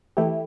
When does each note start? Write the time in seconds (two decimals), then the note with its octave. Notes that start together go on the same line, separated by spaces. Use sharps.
0.17 E3 A3 E4 G4